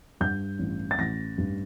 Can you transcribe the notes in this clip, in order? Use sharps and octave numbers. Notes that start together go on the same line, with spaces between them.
G2 G6
A1
A6
A1 A#6
G2